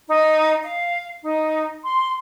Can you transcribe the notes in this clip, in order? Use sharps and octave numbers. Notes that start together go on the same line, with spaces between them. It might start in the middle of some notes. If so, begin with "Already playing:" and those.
D#4
F5
D#4
C6